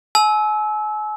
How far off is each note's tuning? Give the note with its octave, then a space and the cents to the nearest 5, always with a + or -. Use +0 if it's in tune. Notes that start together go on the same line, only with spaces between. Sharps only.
G#5 +40 E6 -20